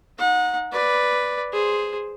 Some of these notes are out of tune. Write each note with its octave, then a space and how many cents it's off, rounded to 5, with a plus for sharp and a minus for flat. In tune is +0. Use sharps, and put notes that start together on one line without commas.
D#4 +0 F#5 -30
B4 +0 D5 +0
G#4 +0 C5 +0